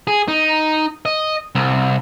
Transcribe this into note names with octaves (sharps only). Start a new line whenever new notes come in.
G#4
D#4
D#5
C2